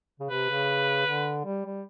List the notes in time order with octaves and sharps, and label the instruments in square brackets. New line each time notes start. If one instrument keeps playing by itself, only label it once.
[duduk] C#3
[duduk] C3 [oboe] B4
[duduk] C#3
D3
G3
G3